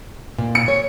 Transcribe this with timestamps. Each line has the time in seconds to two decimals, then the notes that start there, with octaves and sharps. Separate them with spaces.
0.38 A#2
0.55 C#7
0.68 C#5